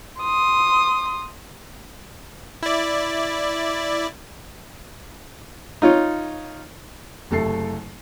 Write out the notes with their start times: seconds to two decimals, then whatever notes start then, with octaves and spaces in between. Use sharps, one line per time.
0.20 C6 D#6
2.63 E4 D5
5.82 D#4 F4 C#5
7.31 F#1 C3 A3 A4 C7